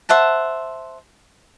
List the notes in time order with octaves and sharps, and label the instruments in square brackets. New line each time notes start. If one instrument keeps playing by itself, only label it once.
[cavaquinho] C5 E5 F#5 A5